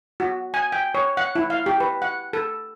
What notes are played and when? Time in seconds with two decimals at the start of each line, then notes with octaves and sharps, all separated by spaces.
0.20 F#4
0.54 G#5
0.72 G5
0.95 C#5
1.17 F#5
1.35 E4
1.50 F5
1.66 G4
1.80 B4
2.02 F#5
2.33 A4